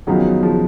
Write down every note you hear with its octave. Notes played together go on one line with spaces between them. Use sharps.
F#2 D#3 F3 F#3 B3 D#4 G#4
C#3 F3